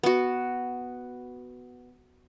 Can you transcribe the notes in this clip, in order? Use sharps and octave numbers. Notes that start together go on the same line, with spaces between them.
B3 F#4